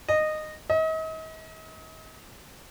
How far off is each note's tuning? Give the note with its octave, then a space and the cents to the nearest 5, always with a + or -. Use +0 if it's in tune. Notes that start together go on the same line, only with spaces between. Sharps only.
D#5 -15
D#5 +40